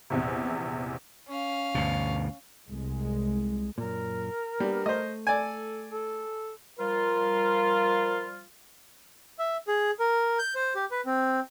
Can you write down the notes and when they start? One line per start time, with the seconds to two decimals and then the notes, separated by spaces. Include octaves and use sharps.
0.10 A#1 E2 C3
1.28 C#4 F5
1.75 D2 G2 B2
2.68 C2 G#3
3.78 F#2 A#2 A#4
4.60 G3 A#3 B3 D4
4.86 A3 C5 D#5
5.27 A4 D5 G#5
5.89 A4
6.80 F3 G3 F4 A#4
9.39 E5
9.68 G#4
10.00 A#4
10.39 G6
10.55 C5
10.75 G4
10.91 B4
11.06 C4